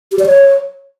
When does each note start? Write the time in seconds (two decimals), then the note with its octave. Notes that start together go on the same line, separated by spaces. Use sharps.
0.12 G4
0.19 D5
0.26 C#5